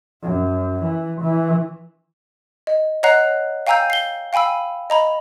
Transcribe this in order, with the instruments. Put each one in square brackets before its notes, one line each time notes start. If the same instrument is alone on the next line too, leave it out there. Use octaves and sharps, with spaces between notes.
[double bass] F#2
E3
E3
[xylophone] D#5
C#5 D#5 F#5 A#5 F#6 C7
F5 G5 G#5 A#5 E6 G6
C7 G7
F5 G5 G#5 B5 E6
D#5 A#5 B5